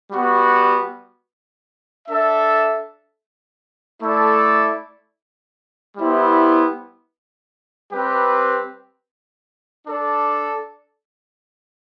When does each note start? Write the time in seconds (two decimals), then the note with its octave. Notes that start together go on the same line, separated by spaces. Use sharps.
0.11 G3 B3 F#4
2.07 D4 A4 E5
4.01 A3 E4 A4 D5
5.97 G3 B3 E4 G4 C5
7.92 G3 C4 G4 B4
9.87 D4 A4 D5